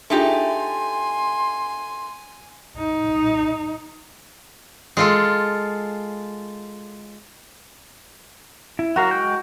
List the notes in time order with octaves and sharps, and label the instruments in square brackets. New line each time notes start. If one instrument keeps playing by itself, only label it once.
[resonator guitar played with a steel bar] A3 D#4 G4 [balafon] D4 F4 G#4 [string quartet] G#5 [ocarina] C6
[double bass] D#4
[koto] G#3 F4 A4
[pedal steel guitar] E4
[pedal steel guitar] F#3 A#4 F5 [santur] F#4
[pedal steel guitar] G#3 G5 G6